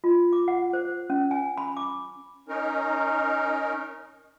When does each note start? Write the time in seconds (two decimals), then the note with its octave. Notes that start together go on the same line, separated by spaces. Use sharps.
0.04 F4
0.33 D6
0.48 F#5
0.73 C5
1.10 C#4
1.31 G#5
1.57 B5
1.77 D6
2.48 C#4 D#4 A#4